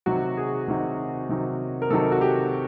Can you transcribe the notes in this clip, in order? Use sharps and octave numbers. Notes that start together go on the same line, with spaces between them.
C3 D#3 F#3 F#4
G#4
C3 D#3 F#3
C3 D#3 F#3
A#4
C3 D#3 F#3 A4
F#4
G4